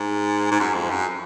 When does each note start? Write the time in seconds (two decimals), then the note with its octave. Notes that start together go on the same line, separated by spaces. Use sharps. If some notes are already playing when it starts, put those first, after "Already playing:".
Already playing: G#2
0.51 G#2
0.60 F#2
0.75 F2
0.90 F#2